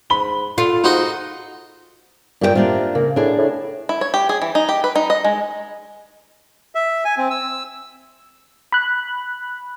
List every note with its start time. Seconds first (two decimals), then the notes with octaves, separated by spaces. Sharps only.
0.10 G#2 B5 G7
0.58 F4 A4
0.84 G#2 D#4 F#4 C6
2.41 G2 A#2 G4 G5
2.55 C3 A#3 D4 F4
2.95 C#3 A#3
3.16 A2 D4 G#4
3.38 A2
3.89 E4
4.01 C#5
4.14 G4
4.29 G#4
4.42 E3
4.55 D#4
4.69 G4
4.84 B4
4.96 D#4
5.10 D#5
5.25 G#3
6.75 E5
7.05 G#5
7.17 C4
7.31 E6
8.72 B5 F#6